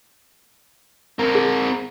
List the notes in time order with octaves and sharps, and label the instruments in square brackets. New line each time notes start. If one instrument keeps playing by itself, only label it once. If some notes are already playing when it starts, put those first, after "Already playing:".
[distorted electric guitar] C4 A#4
[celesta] G#4